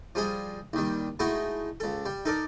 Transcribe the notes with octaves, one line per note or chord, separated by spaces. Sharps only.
F3 G3 G#4 D#5
D#2 D#3 G3
G#3 A3 D#4 E4 F#4
C#2 A4
G3
D#4 A4 A#4 D5